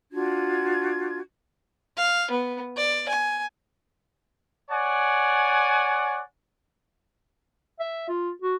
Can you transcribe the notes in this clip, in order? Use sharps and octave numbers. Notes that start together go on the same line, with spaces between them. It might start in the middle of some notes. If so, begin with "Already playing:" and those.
D4 F4 F#4 G#6
F5
B3
D5
G#5
C#5 D5 F#5 G#5
E5
F4
F#4